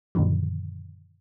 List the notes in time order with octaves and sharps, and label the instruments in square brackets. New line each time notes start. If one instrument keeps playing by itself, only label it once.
[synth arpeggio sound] F#2 A#2 D3 D#3 F3